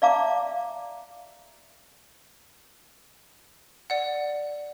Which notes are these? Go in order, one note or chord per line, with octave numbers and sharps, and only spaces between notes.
D5 E5 F5 A5 A#5 D6
D5 F#5